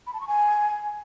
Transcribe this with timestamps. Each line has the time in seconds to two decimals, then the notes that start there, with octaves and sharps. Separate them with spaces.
0.07 B5
0.14 A5
0.21 C#6
0.28 G#5